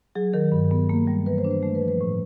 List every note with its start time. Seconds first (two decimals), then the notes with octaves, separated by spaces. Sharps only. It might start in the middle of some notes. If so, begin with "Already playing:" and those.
0.15 F#3 G#4
0.33 D#3 A#4
0.52 G2
0.71 B3
0.89 A#3
1.07 G3
1.26 E3 B4
1.38 C5
1.44 D4
1.51 C5
1.63 A3 C5
1.75 B4
1.82 F3
1.88 B4
2.01 A2